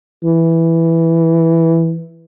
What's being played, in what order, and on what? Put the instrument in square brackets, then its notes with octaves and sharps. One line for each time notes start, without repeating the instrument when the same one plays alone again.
[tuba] E3